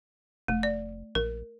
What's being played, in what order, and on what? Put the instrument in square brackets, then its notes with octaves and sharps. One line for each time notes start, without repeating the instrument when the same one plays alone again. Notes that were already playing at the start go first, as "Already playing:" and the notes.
[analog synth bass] F1 [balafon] A3
[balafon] D5
[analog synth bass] A#1 [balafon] A#4